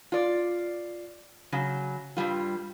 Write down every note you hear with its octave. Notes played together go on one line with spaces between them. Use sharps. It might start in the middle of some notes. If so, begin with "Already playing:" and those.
F4 D5
C#3 F#3
G2 B2 G3 F4